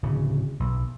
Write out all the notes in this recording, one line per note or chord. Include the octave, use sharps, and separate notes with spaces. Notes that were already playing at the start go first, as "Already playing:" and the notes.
D1 C#3
B1